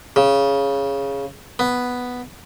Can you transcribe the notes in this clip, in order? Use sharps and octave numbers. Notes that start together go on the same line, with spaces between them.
C#3
B3